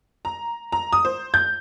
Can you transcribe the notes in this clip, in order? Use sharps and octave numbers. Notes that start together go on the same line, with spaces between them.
A#5
A#5
D#6
C5
G6